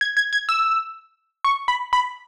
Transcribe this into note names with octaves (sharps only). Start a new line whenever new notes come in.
G#6
G#6
G#6
E6
C#6
B5
B5